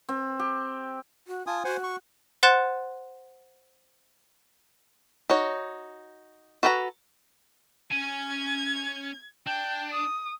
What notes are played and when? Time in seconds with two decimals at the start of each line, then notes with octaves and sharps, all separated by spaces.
0.09 C4
0.39 G4
1.27 F#4
1.47 F4 G#5 A5 D#6
1.65 F#4 C5 F#5 G#5
1.84 C#6
2.43 C5 F#5 C6 F#6 A6 E7
5.30 D#4 F#4 C#5
6.63 F#4 A4 B4 G5 A#5
7.92 C#4 G#5 G#6
9.47 D4 G5
9.93 D#6